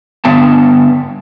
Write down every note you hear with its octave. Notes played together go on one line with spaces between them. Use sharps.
G2 D3 B3 A5